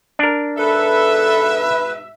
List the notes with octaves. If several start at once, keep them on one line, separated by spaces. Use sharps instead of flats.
D4 A#4
G#2 B2 A4 B4 E5